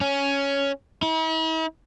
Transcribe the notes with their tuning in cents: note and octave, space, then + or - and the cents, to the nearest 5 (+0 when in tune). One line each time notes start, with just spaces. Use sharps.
C#4 +5
E4 -45